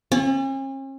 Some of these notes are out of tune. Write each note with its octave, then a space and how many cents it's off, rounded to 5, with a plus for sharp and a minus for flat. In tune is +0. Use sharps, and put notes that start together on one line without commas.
C#4 -45